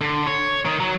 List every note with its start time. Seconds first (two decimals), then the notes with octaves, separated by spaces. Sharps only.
0.01 D3
0.27 C#5
0.65 D#3
0.80 F#3